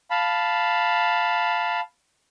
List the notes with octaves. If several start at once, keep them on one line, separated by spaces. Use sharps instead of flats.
F5 A5 B5